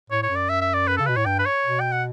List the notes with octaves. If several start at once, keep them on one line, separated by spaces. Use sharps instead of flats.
A2 C#5
C#5
F#2
D5
E5
E5
D5
B4
C#3 A4
B2 B4
A2 C#5
G2 G5
B4
C#5
B2
G5
F#5